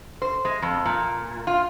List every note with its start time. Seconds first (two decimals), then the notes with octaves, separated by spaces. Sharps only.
0.22 C5
0.45 G#3
0.62 F2
0.86 A#2
1.47 F4